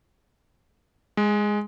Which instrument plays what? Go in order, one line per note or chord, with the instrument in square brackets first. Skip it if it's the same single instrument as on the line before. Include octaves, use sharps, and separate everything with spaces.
[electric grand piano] G#3